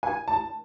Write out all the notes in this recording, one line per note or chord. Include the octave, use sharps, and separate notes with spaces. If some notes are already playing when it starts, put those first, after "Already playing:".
G#5
A5